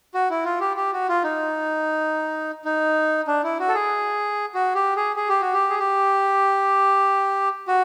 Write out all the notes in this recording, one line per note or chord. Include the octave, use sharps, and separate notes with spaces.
F#4
E4
F4
G4
G4
F#4
F4
D#4
D#4
D4
E4
F#4
A4
G#4
F#4
G4
G#4
G#4
G4
F#4
G4
G#4
G4
F#4